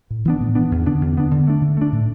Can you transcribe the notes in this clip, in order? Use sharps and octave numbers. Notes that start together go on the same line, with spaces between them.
A2
E3 B3 D4
A2
E3 B3 D4
E2
D3 B3 D4
E2
D3 B3 D4
D3
A3 D4
D3
A3 D4
A2